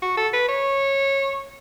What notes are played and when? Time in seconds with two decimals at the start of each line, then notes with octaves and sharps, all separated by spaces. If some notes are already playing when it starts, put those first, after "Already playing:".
0.02 F#4
0.18 A4
0.33 B4
0.49 C#5